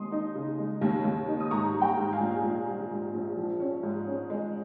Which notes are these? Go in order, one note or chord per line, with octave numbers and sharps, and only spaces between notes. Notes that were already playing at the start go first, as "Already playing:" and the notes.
Already playing: D#2 G#3 C6 D#6
D#4
C#3
G#3
D#2
D#2
D#4
D#6
G#2 A#5 C#6
G3
G5 A#5
G#2
F5 G#5
A#1
A#1
G3
G#2
A#1
F3
C#4
G#2
C#4
G#3